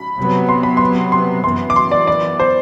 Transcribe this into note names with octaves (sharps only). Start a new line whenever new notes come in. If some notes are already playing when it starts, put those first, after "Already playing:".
Already playing: B5
C3 F#3 B3
C6
B5
C6
C6
F#2 E3 B3 C6
D6
C6
D5
D5
C5